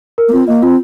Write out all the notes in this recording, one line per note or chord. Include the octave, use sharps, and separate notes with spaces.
A#4
A#3
C4 F4
A#3 D#5
C4 F4